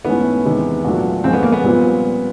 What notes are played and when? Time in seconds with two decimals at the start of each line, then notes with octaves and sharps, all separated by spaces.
0.05 G#2 E3 A3 B3 C#4 E4
0.45 E2 C3 D#3 G#3
0.84 A#2 F#3 A3 D4 F#4
1.24 A#2 F3 G#3 C4 C#4
1.33 B3
1.43 A#3
1.53 B3
1.64 A#2 G3 C4 F4